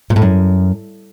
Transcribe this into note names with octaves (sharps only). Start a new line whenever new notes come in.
A#2
A2
F#2